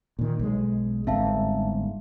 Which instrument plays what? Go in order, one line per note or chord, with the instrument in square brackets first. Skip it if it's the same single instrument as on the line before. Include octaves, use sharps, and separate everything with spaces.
[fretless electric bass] A#2 D#3
B1 G#3
[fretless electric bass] G1 G#2 C4 [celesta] E5 F5 A5